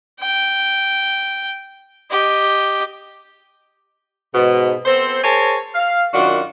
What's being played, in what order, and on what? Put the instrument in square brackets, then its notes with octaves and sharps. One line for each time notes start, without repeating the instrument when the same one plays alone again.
[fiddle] G5
G4 D#5
[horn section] G#2 B2
B3 C4 A4 C5
G#4 A#4 C5 C#5 G#5 A5
F5
F#2 D#3 D4 F4 F#4